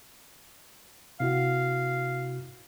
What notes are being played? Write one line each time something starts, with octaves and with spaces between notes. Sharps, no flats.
C3 E4 F#4 F5